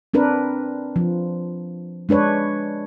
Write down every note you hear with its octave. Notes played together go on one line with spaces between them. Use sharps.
C4 D4 A#4 B4
F3
G#3 D4 B4 C#5